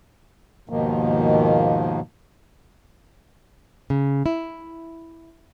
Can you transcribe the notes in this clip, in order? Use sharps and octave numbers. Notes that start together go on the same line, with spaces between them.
D#2 G#2 B2 D#3 F3 A#3
C#3
E4